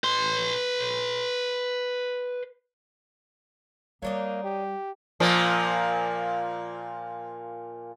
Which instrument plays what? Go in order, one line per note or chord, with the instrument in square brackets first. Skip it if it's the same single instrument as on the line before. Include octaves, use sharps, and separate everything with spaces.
[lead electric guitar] B4 C6
[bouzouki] F#3 D4 D#4 [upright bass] G3 [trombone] A#3
[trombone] G4
[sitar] A#2 F3 A#3